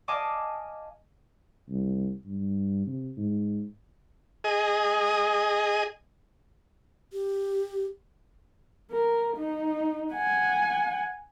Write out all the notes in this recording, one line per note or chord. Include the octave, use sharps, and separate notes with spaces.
D#5 F5 G#5 A5 D6 D#6
C2
G2
C3
G#2
G#4 D#5
G4
A#4
D#4
F#5 G#5